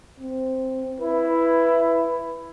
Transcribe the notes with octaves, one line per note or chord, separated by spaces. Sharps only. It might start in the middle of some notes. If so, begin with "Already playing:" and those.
C4
E4 B4